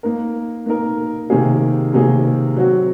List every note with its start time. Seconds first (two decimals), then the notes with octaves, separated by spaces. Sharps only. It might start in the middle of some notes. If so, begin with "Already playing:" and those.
0.03 A#3 D#4 A#4
0.66 A#3 D#4 A#4
1.30 C3 D#3 A#3 D#4 G#4
1.93 C3 D#3 A#3 D#4 G#4
2.57 F#3 C4 F#4